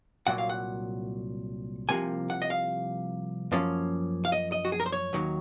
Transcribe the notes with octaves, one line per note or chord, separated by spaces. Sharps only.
C2 A#2 F#3 F#5
F5
F#5
C2 C3 F3 A#3 G#5
F#5
D#5
F5
F#2 F3 A#3 C#4
F5
D#5
D#5
F#4
G#4
A#4
C5
C#5
D#2 D#3 F#3